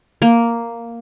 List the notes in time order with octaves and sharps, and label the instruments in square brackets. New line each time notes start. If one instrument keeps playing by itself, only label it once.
[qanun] A#3